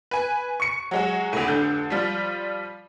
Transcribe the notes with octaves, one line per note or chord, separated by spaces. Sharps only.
B4 G#5
C#6 C#7
F#3 G#3 F#4
D2 A2
F1 D3 G6
F3 G3 F4